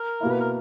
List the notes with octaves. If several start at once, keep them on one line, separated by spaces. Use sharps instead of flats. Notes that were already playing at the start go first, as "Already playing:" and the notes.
Already playing: A#4
B2 A#3 E4
B4
A#4